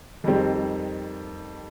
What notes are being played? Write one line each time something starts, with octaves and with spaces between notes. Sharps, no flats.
F2 D#3 G3 C4